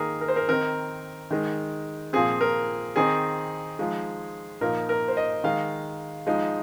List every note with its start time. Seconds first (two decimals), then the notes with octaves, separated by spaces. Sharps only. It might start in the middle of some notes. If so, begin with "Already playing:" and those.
Already playing: D#3 A#3 D#4 G#4 A#4
0.21 A#4
0.28 C5
0.36 A#4
0.48 D#3 C4 D#4 A#4
1.31 D#3 G#3 D#4
2.13 A#2 F3 C4 G#4
2.41 A#4
2.96 D#3 C4 D#4 G#4
3.79 F3 G#3 D#4
4.61 A#2 F3 A#3 D#4 A#4
4.89 A#4
5.08 C5
5.17 D#5
5.44 D#3 G#3 D#4 F5
6.26 F3 G#3 D#4